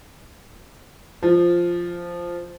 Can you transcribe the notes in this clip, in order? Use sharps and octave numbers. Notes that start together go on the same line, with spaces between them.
F3